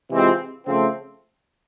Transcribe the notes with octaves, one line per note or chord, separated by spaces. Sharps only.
C3 E3 G#3 C4 F4
C#3 F3 A3 C4